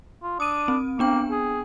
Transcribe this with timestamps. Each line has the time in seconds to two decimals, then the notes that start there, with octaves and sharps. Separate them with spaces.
0.23 F4
0.40 D4 D#6 D#7
0.68 C4
0.99 A#3 B3 D4 G5
1.31 G#4